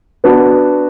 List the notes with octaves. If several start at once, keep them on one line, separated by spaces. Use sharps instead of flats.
B3 D4 F#4